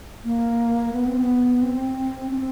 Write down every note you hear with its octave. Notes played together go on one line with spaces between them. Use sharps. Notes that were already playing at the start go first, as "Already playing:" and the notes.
A#3
B3
C4
B3
C4
C#4
C4